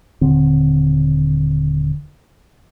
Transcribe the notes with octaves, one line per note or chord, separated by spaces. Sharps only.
D#1 D3 C4